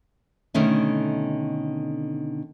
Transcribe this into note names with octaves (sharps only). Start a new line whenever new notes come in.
B2 D3 D#3 A3 C#4 D4